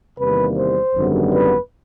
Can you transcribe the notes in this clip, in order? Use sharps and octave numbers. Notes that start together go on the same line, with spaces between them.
E2 C3 D#3 G3 A#3 B4
C5
G#1 F#2 D3 G3 B3
B4